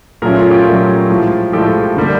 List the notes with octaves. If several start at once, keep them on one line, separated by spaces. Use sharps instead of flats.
A#2 F#3 A3 C#4 G#4 A#4
F4
F4 G4
A#2 F#3 A3 C#4
A2 F3 G#3
A2 F3 G#3 G4 A4
D3 G3 A#3